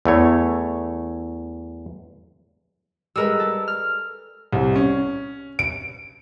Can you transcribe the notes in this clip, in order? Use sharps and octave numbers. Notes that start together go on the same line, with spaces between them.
E2 A3 C#5
G3 G#3 A#4 B4 E6
A4
F6
C2
C#4
D7